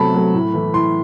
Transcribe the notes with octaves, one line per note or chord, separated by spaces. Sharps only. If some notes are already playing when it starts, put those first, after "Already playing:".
Already playing: C3 F#3 A3 A5 B5
F#3 A3
A2
E3 A3
A2 C6